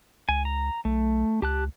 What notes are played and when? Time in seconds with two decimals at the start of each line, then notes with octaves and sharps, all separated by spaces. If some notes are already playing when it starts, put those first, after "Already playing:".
0.29 C#2 G#5
0.45 A#5
0.85 B1 A3
1.42 C#2 G4 A5 F#6